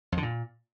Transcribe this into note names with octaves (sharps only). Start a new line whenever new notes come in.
F2
D3
A#2